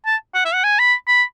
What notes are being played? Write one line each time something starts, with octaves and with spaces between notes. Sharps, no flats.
A5
F#5
E5
F#5
G#5
B5
B5